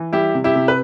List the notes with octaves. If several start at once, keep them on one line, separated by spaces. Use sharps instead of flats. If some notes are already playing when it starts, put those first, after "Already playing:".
Already playing: E3
G3 E4 G4
C3
E4 G4
C3
B4